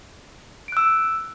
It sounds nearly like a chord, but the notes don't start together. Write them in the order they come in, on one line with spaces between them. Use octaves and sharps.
D7 F#6 E6